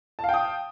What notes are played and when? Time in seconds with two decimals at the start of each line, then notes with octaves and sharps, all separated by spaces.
0.19 A5
0.24 F5
0.29 G5
0.34 D#6